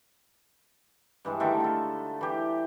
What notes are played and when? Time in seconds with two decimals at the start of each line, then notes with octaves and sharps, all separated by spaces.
1.25 G2 E3 G#3
1.40 D3 D#3 A3 E5
1.60 F4 A4
2.21 E3 G4